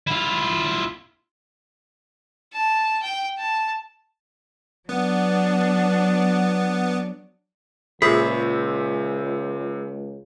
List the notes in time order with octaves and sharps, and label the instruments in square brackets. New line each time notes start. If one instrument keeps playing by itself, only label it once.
[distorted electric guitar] E4 F4
[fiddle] A5
G5
A5
[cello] F#3 D4 [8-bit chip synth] B3
[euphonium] C#2 [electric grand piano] A#2 C5 E5 [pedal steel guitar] G#3 C#5 B5 [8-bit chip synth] G#4